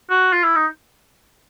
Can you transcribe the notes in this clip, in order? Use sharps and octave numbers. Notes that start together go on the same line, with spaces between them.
F#4
F4
E4
D#4